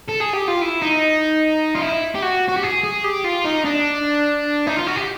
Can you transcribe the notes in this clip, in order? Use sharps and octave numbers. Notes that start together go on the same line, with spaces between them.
A4
G#4
G4
F4
E4
D#4
F4
E4
G4
F#4
F#4
G4
G#4
G#4
G4
F4
D#4
D4
D#4
F4
F#4
G4